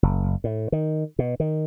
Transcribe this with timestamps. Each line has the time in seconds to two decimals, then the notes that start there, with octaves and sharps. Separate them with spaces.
0.03 F#1
0.44 A2
0.72 D#3
1.19 B2
1.40 D#3